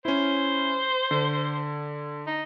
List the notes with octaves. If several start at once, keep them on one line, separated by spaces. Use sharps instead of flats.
C#4 E4 C5
D3
D#4